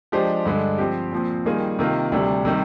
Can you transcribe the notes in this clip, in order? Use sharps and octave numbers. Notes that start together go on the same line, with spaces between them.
F3 G#3 D4 G4 C5
G2 D3 G#3 D4
F3 C4 G4
A#2 F3 C4
D#3 G3 A#3 F4 G#4
C3 D#3 A#3 F4
D2 C3 G3 D4
C3 D#3 G3